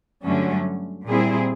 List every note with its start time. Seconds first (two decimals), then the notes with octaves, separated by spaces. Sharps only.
0.24 G2 D3 F#3 A3 C#4
1.08 A#2 G3 C4 E4 G#4